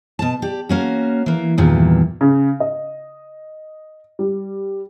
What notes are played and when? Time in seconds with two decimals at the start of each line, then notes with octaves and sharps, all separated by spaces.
0.19 B2 A5
0.42 G4 D5
0.69 A#3 C#4 F#4
1.26 E3 A#3
1.58 E2 G2 A#2 D#3 E3
2.21 C#3
2.60 D#5
4.19 G3